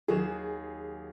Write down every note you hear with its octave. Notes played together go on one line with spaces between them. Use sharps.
D#2 F#3 G#4 E7